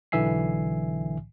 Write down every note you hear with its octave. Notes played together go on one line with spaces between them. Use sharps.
B1 D3 E3 E5 G#5 C7